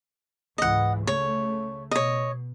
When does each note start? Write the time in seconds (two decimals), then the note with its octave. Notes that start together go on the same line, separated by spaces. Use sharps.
0.58 C#2 G#2 E3 D#5 F#5
1.07 C#3 A3 C#5
1.91 B2 C#5 D#5